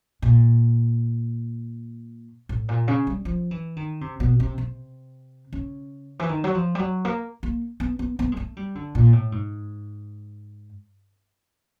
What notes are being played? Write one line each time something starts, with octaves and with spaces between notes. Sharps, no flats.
A#2
A2
A#2
C#3
G3
F3
E3
D#3
C3
B2
C3
C3
C#3
E3
D#3
F#3
F3
G3
F#3
A#3
A#3
B3
B3
B3
G#3
A3
G3
D3
A#2
A2
G#2